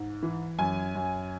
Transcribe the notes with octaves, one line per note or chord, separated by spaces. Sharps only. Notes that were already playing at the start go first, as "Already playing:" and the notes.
Already playing: G#2
E3
F#2 G#5
F#2